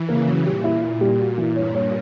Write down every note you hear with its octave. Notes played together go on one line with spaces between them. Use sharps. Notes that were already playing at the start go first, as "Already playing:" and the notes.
Already playing: E3
C#3 A#3
F#3
A#2 G3
E4
E4
G3
F#4
E3
G2 C#5
C#5